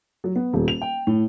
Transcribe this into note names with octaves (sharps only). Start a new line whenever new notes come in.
F#3
B3
D#1
F7
G5
A2